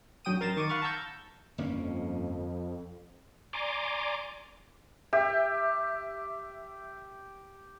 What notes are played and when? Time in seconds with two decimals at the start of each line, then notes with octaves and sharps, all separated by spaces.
0.25 A1 D3 F#3 G5 D#6 D#7
0.40 F#2 A#4 C6 A6 A#6 E7
0.56 D#3 C#6 D6 A6 D#7
0.69 F5 F#5 B5 C#6 F6 A6
0.82 A5 A#5 C#6 E6 G6 A6
1.58 G1 F2 A#3 C#4
3.53 D5 G#5 A#5 C6 D6
5.13 G4 E5